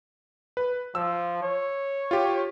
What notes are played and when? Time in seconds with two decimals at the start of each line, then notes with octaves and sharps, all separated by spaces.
0.57 B4
0.95 F3 E6
1.43 C#5
2.11 F4 G4